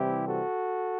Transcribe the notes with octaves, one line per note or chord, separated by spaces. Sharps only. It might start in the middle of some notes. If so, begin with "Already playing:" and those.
Already playing: C3 E3 G3 C4 E4 G4
F#4 A4